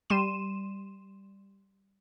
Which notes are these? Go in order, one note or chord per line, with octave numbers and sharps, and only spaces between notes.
G3 C6 D#7 E7